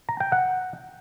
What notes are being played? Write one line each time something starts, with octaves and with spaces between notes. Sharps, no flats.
A#5
G5
F#5